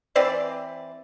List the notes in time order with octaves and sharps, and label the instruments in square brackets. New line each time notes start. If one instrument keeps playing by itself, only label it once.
[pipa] E3 C4 C5 D5